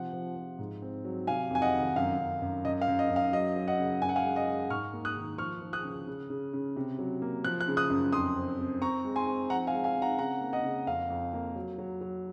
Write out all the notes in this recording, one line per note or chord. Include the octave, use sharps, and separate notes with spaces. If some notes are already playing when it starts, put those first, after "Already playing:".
Already playing: C3 F3 F#5
F3
F3
G#2
C4
F#3
C3 F5 G#5
F2 G#5
D#5 F#5
D#3
F#2 F5
F#2
F#2
F#2 D#5
F5
F#2
D#5
F#2
F5
F#3 D#5
F#3
D#5 F#5
C#3
F#2 G#5
F#5
F5 G#5
G#3
D#5 F#5
G#3
G#2 C#6 F6
A#3
D#6 F#6
D#3
F3 C#6 F6
F3
D#6 F#6
C#3
C#3
C#3
C#3
C3
F#3
A#3
F3 F#6
F#6
C#3
D#6 F#6
F#2
F2 C6 D#6
C4
C4
C4 A#5 C#6
G#3
G#5 C6
C4
F3 F#5 A#5
F5 G#5
G#3
F5 G#5
C4
F#5 A#5
C#3 F#5 A#5
A#3
D#5 F#5
C#3
F2 F5
F2
A#3
F#3
F#3
F#3